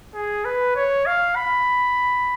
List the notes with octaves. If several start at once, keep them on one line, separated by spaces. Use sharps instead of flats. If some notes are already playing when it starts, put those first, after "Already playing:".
G#4
B4
C#5
F5
B5